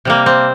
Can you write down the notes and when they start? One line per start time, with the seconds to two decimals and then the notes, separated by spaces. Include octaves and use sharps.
0.05 C3 G3 A#3
0.26 C4